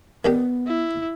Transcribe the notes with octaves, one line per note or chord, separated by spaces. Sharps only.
D#3 B3 D4 G4
E4